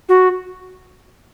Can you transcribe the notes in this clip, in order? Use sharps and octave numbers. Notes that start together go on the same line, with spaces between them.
F#4